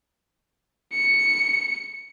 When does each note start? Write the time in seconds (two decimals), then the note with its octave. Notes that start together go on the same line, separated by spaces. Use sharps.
0.93 C#7